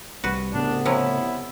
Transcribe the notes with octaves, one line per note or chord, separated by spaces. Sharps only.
C2 G3 F#4 B4
C2 A2 C#3 B3 D4
C3 F3 C#4 E4